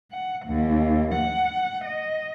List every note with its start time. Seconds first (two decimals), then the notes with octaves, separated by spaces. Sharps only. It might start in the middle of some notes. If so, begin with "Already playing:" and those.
0.12 F#5
0.46 D#2
1.15 F#5
1.85 D#5